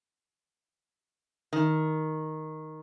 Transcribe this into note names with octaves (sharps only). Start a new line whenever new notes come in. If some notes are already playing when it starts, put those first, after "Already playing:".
D#3